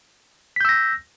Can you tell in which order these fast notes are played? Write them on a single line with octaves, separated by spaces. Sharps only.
B6 G6 E6 A#6